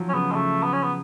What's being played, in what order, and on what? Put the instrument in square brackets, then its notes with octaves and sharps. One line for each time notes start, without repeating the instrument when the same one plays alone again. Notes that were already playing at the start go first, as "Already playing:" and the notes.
Already playing: [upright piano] F3 F#3
[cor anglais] C#4
[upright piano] C#3 [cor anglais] B3
[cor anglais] G#3
[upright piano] C#3 [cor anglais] A3
[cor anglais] B3
C#4
B3